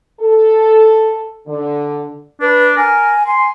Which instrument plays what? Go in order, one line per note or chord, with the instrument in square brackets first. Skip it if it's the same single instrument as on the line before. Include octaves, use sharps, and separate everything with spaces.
[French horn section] A4
D3
[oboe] D4 [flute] B4
[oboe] A#4 [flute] G#5
[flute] G#5 [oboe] C6